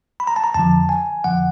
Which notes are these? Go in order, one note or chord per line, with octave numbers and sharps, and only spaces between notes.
B5
A#5
A5
A#5
F2 D3 F3 A5
G#5
F2 D3 F3 F#5